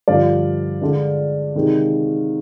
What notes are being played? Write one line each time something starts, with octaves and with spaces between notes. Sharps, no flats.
G2 D3 F3 D5 F5
D3 G#3 D4
C3 D#3 G#3